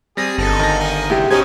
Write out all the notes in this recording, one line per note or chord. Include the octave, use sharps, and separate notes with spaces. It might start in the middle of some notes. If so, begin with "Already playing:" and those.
G3 C4 G#4 A#6
G1 D#4 A4
D#3 D#5 A#6
D#4 A#4 G#5
C2 E4 G4
B2 C#4 D#4 G4 C5 G#5 G#6